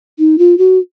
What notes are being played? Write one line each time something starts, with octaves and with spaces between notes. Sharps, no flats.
D#4
F4
F#4